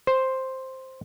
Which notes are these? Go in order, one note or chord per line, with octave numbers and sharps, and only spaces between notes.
C5